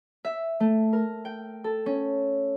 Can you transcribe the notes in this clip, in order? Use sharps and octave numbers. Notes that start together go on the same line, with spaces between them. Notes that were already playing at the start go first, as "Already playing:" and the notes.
E5
A3
A#4
G5
A4
C#4